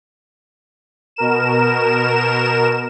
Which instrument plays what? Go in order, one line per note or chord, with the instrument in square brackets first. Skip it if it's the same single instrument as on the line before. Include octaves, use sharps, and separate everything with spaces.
[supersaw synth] B2 A#4 E7